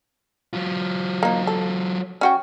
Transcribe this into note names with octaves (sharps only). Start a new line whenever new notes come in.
F#3 F4
A#3 D#4
A4
C#4 F#4 G5